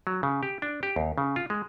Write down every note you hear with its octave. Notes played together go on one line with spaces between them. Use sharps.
F#3
C#3
G4
D4
G4
D#2
C#3
F4
G#3